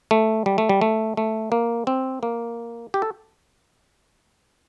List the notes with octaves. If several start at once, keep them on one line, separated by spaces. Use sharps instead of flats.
A3
G3
A3
G3
A3
A3
A#3
C4
A#3
G4
A4